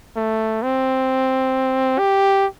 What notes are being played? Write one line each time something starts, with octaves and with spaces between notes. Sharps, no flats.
A3
C4
G4